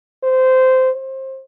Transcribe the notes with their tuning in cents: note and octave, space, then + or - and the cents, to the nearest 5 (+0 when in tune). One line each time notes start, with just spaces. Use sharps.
C5 -15
C5 +25